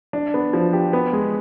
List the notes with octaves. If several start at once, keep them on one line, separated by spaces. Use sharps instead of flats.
D4
B3
F3
G4
B3
G#3